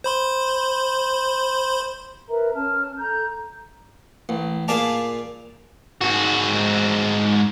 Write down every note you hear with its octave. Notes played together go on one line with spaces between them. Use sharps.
C5 B5 C6
A#4 B4 E5 A#5
C#4 A5 F6
A4 A#5 G6
A1
A#2 F4 G#4 D5 A5 D6
G#2 F#4